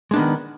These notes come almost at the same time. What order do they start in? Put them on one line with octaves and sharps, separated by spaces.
G#3 D4 B3 D#3